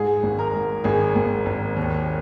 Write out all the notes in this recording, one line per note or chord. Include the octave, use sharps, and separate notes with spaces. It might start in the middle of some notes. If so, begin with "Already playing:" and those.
Already playing: G#2 G#4
G#1
A#4
G#2
G#1 G#4
G#1
G#1
D#2